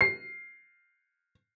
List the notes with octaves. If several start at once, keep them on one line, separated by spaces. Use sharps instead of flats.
C7